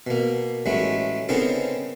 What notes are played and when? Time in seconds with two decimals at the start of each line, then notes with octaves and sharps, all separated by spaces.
0.07 B2 A#3
0.66 A1 F#3 G#3 A3 B5
1.29 C#3 B3 C4 D#4 A4 A#4